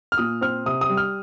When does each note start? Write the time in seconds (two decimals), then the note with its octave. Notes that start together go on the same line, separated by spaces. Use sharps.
0.12 F6
0.18 A#2 D#6
0.41 C4 F6
0.66 C3 D#6
0.81 D#6
0.89 G3
0.97 F6